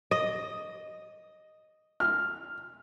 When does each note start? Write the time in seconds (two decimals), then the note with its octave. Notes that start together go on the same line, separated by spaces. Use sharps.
0.11 D#5
2.00 F6